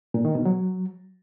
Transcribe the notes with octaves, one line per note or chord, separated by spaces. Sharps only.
A#2
D#3
B2
F#3